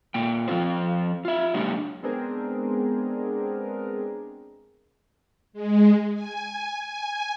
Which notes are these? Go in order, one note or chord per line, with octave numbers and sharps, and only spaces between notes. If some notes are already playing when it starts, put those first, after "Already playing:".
A#2 A#3 G5
F3 C4 F4 C5
F4 E5
F#3 G#3 A#3 D4 F#4 G4
G#3 B3 C4 D4 G#4 A#4
G#3
G#5
G#5